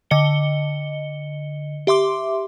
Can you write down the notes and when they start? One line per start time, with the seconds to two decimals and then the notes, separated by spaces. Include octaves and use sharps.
0.11 D3 D#5 C#7 G7
1.87 G4 E5 C6 D6